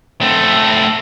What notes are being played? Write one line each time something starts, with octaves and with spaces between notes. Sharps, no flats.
A3 C4